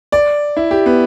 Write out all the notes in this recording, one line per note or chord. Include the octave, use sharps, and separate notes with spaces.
D5
E4
G4
B3